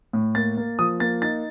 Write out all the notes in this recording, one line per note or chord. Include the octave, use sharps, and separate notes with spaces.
A2
A#3 A6
A#3
F3 D#6
A#3 A6
D#4 A6